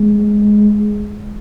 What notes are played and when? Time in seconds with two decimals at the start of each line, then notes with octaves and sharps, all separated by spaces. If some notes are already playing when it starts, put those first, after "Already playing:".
Already playing: G#3